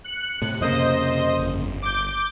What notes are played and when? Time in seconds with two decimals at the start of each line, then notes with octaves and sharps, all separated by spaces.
0.04 F#6 C#7
0.42 A2 C3
0.61 F2 C#3 A#3 C5 D#5
1.39 G1
1.82 D6 G6